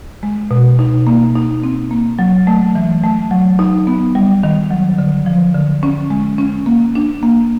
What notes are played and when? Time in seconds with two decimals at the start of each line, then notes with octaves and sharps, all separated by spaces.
0.23 G#3
0.51 B2
0.79 D#4
1.07 A#3
1.35 D#4
1.63 C4
1.91 A#3
2.19 F#3
2.47 A3
2.75 E3
3.03 A3
3.31 F#3
3.59 D#4
3.87 B3
4.15 G3
4.43 D#3
4.71 F#3
4.98 D3
5.26 F3
5.54 D3
5.83 C#4
6.10 G#3
6.38 C#4
6.66 A#3
6.95 D4
7.23 A#3